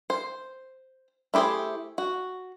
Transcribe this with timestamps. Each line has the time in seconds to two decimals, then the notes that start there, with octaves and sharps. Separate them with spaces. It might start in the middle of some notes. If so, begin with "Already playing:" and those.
0.10 C5
1.34 A3 E4 G4 G#4 C5
1.98 F#4